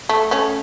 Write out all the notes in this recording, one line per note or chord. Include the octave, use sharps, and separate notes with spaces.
A3
A3 C#4